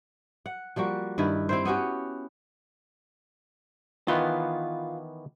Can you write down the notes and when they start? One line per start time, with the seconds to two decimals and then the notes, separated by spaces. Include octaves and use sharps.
0.46 F#5
0.76 F3 G3 A#3 F#4
1.18 G2 D#3 E4 B4
1.49 C4 E4 C5
1.65 B3 C#4 F#4 G4
4.08 D#3 E3 B3 F4